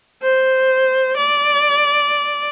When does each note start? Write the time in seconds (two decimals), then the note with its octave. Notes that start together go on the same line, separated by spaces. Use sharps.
0.23 C5
1.17 D5